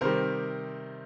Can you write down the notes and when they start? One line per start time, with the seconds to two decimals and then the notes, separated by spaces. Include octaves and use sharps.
0.01 C3 D#3 G3 A#4 C5